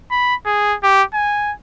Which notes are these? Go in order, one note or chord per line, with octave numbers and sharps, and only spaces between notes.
B5
G#4
G4
G#5